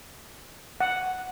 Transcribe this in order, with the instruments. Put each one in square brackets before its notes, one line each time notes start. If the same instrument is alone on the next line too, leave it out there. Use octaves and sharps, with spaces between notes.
[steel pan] F#5